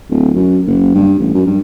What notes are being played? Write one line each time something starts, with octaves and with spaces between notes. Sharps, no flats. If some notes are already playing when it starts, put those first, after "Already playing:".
D1
F#2
F#1
G2
A1
F#2
G2